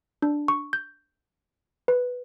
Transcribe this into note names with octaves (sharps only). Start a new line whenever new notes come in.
D4
C#6
G6
B4